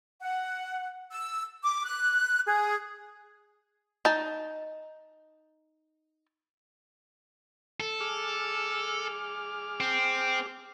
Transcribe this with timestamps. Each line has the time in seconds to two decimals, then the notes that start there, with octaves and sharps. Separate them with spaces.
0.22 F#5
1.11 E6
1.63 D6
1.85 F#6
2.46 G#4
4.05 D#4 A5
7.80 A4
8.00 G#4 D6 F6
9.80 C4